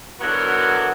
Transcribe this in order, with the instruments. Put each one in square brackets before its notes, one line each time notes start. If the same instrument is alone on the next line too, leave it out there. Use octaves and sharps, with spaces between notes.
[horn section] D3 E3 F#3 B3 F#4 A#4